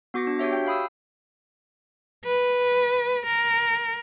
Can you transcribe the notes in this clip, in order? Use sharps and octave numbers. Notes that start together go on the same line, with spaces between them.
B3 F#4 D6 A#6 C#7
D4
F#4 G4 C#5 E5
G5 G6
F5 B5 D#6 E6
B4
A#4